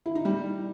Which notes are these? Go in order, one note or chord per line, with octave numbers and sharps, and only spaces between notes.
E4
D#4
G3